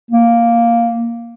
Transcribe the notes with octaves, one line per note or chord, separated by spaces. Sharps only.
A#3